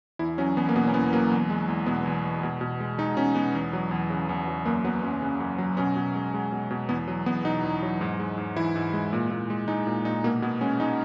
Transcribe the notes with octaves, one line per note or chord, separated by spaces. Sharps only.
E2 E4
F#3 C#4
E2 B3
A#3
B2 B3
C#4
E2 B3
F#3 A#3
E2
G#3
E2
B2 B3
E2
G#3
B2
B2
G#3
G#3 D#4
B2 C#4
B2 B3
E2
F#3
E2
C#3
E2
F#3
F#2 A#3
F#3 B3
F#2 C#4
C#3 C#4
F#2
F#3
B2 C#4
B2
G#3
G#3
B2
B2
E2 B3
F#3
E2 B3
B2 D#4
E2
F#3
G#2
G#3
G#2
E3 E4
G#2
G#3
A#2
A#2
G#3
G#3 D#4
A#2
A#2 D#4
B2 A#3
B2 B3
G#3 C#4
G#3 D#4